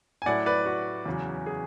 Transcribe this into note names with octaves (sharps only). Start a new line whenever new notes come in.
G#5
A2 F#3 A3 E4 D5 F#5
B4 D5
F#4
E2 C#3 F#3
G#4